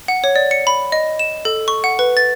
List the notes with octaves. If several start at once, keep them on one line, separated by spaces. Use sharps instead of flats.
F#5
C#5
D5
C#7
B5
D#5
E7
A4
C#6
F#5
B4
A6